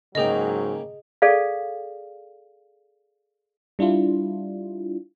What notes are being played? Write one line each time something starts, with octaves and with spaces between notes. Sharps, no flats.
G#2 C#3 F#3 A#3 G#4 D#5 G5
G#4 A4 D5 F5
G3 D4 E4 F4